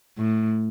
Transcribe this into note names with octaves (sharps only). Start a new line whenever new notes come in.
A2